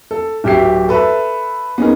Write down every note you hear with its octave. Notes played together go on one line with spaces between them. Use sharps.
A4
D1 F#3 G4 E5 C7
A4 B4 E5
B3 C#4 D#4 G#4 A#4